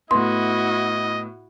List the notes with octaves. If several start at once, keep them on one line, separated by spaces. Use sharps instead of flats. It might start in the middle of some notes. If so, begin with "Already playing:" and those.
A2 B3 E4 F#4 D#5 C6